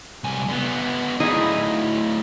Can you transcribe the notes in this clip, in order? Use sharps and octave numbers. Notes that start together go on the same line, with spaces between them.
C2 G#5
D3 B3
D2 A2 D#4 E4 G#4